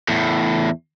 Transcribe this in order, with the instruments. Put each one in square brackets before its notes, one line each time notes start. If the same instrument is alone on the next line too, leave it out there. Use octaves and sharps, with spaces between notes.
[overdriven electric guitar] E2 A2